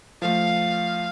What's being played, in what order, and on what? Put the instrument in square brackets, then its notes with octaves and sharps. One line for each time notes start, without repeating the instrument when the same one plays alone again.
[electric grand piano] F3 A3 [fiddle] F5